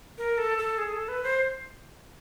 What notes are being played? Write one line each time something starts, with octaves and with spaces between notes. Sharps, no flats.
A#4
A4
A4
G#4
A4
B4
C5